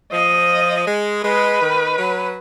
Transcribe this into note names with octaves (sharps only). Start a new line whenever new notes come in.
F3 D#5
G#3
G#3 B4
D#3
F#3